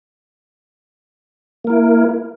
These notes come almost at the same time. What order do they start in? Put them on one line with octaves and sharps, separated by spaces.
A#3 A#4 E4